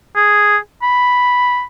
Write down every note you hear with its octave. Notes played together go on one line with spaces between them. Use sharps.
G#4
B5